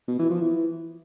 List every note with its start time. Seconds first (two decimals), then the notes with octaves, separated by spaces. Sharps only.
0.08 B2
0.19 E3
0.30 F3
0.42 E3